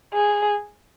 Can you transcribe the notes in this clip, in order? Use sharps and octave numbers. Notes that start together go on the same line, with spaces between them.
G#4